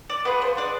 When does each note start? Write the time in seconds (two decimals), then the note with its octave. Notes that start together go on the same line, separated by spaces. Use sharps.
0.10 D5
0.25 B3 F4 G#4 B4
0.42 C5
0.57 D4 G#4 D5